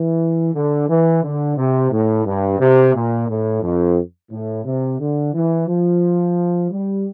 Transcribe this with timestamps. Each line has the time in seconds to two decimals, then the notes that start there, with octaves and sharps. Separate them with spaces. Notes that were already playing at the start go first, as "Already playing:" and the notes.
Already playing: E3
0.54 D3
0.89 E3
1.24 D3
1.57 C3
1.92 A2
2.26 G2
2.60 C3
2.95 A#2
3.29 A2
3.63 F2
4.31 A2
4.65 C3
4.99 D3
5.34 E3
5.68 F3
6.71 G3